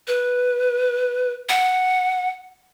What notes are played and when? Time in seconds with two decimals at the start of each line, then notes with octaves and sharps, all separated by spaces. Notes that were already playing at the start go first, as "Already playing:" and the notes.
0.08 B4
1.49 F#5